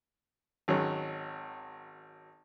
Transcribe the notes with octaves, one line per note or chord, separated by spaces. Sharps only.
G#1 F#3 C#4